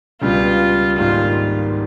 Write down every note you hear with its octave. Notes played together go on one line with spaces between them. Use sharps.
C#2 B2 G3 F4
G#1 G#2 D#3 G3 A#3 F4